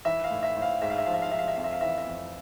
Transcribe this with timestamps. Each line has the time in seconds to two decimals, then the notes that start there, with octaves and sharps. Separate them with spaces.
0.05 E3 E5
0.24 F5
0.31 A2
0.43 E5
0.56 A2
0.62 F5
0.82 G#2 E5
0.90 F5
0.98 E5
1.06 F3 F5
1.14 E5
1.22 F5
1.31 F3 E5
1.39 F5
1.48 E5
1.56 F2 F5
1.64 E5
1.73 F5
1.81 E3 E5
1.88 F5
1.98 E5
2.07 F2